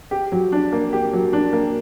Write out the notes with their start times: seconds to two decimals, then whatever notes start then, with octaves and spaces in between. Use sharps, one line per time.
0.11 G4
0.32 F#3
0.52 D4
0.72 A#3
0.93 G4
1.13 F#3
1.33 D4
1.53 A#3